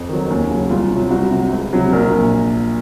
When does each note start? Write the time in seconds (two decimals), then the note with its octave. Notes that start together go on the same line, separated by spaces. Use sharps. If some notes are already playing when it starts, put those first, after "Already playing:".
Already playing: F2
0.09 D#3 F#3
0.30 D#2 C#4
0.49 C#3 F#3
0.70 C2 F4
0.90 C3 F#3
1.11 C2 F#4
1.31 C3 F#3
1.53 C#2
1.73 C3 F#3
1.93 A#1 A#4
2.13 A#2